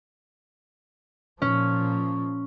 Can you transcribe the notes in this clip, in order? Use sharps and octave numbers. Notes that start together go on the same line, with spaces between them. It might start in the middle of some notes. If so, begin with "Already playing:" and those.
A#2 F3 C#4